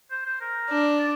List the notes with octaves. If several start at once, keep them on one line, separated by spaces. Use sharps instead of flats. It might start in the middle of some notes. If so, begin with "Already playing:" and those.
C5
C5
A#4
D4
D5